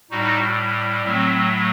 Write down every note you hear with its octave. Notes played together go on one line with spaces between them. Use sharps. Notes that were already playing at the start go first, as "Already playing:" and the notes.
A2 G3 D#4 F#4
A2 F#3 A3 C4